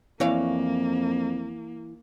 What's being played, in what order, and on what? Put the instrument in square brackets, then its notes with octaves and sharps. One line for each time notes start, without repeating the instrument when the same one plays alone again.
[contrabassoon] F2 [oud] E3 C#5 F5 [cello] A#3